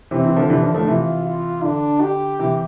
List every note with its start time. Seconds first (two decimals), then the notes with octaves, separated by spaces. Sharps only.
0.11 C3 E3 C4
0.25 C3 E3
0.36 D3 F3
0.50 C3 E3 D4
0.62 D3 F3
0.74 F3 A3
0.87 C3 E3 F4
1.26 F4
1.64 D3 D4
2.01 G4
2.39 C3 E3